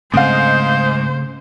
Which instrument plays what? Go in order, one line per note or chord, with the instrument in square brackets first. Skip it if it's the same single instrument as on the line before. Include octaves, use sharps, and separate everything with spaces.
[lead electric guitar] G#2 [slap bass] C#3 A3 C4 [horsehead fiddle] C5 [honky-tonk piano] F5 D#6